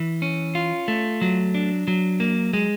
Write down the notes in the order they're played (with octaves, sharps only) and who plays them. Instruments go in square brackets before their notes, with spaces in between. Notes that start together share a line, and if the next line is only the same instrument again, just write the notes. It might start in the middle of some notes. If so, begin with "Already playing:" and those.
Already playing: [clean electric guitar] E3
C#4
F4
A3
F#3
D4
F#3
A#3
G#3